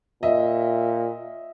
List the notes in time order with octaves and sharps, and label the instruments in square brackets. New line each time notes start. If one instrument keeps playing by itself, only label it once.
[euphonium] A#2 [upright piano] D#5 E5